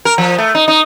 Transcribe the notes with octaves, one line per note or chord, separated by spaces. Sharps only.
A#4
F3
A3
D#4
D#4